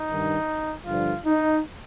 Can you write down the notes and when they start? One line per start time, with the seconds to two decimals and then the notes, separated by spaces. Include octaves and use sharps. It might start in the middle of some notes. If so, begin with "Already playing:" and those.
Already playing: D#4
0.09 G2 D#3
0.86 G2 D3 F3 F4
1.25 D#4